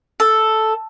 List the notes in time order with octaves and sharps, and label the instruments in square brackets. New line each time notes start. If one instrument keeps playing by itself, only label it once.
[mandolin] A4